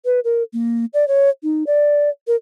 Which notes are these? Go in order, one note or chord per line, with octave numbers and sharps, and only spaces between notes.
B4
A#4
A#3
D5
C#5
D#4
D5
A#4